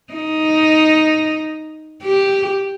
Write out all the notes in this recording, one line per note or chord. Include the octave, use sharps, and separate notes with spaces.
D#4
G4